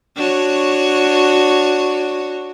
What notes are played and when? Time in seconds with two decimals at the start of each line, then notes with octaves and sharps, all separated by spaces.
0.16 D4 F#4 C#5